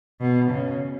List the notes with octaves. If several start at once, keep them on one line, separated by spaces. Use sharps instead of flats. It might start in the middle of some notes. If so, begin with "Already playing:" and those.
B2
C#3